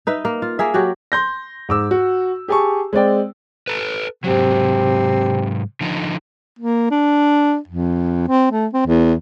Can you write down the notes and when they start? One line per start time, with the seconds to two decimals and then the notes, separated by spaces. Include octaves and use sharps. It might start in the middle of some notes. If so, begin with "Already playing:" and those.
0.07 D#4 B4 E5
0.25 A#3
0.42 F4
0.59 A#3 G#4 E5
0.74 F#3 F#4 G4
1.12 C6 G6 A#6
1.69 G#2 D6 E6
1.91 F#4
2.48 G4 G#4 G#5 A5 C#6
2.93 G#3 C4 D5 G5
3.68 A4 B4
4.24 G#2 C3 F#3
5.81 D3 F3 D#4
6.59 A#3
6.91 D4
7.68 F2
8.28 C4
8.52 A3
8.73 C4
8.87 E2